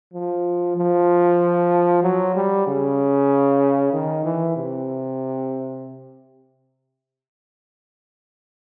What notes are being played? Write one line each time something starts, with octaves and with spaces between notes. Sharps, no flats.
F3
F3
F#3
G3
C#3
D#3
E3
C3